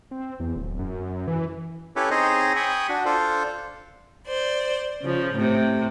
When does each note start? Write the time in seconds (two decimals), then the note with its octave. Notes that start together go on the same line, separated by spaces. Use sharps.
0.11 C4
0.40 E2
0.56 D1
0.79 F#2
1.28 E3
1.96 C#4 E4 G4 A4 B4 C#5
2.11 C4 D#4 G#4 C5 C#5 D#5
2.56 G5 G#5 B5 C#6 D#6
2.89 D4 F#4
3.05 D4 F4 A4 C5
4.26 C5 D5
5.01 C#3 F3
5.34 A2 C3